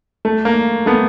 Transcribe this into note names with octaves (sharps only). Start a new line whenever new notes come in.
A3
A#3
A3 B3